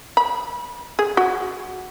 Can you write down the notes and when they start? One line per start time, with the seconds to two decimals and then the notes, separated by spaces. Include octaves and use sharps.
0.17 B5
0.99 G#4
1.17 F#4